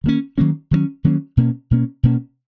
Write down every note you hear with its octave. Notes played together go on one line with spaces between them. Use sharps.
D#3 F#3 A#3 C#4
D#3 F#3 A#3 C#4
D#3 F#3 A#3 C#4
D#3 F#3 A#3 C#4
B2 A#3 C#4
B2 A#3 C#4
B2 A#3 C#4